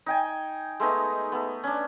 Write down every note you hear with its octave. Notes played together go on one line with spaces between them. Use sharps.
D#4 G5 G#5
G#3 A3 B3 D#4
A3 B3
C#4 D4